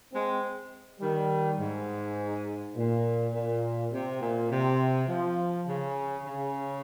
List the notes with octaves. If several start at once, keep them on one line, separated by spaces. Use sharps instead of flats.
G#3 C4
D#3 G3
G#2
A#2
A#2
C3
A#2
C3
F3
C#3
C#3